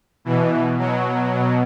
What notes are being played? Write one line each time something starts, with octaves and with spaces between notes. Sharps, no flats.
B2 E3
F#3
B2